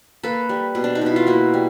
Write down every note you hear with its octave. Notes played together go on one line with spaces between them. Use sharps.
A#3 A4 B4
G3
B2
D4
D#4
B2 E4
F4
A#3 E4 F#4
G3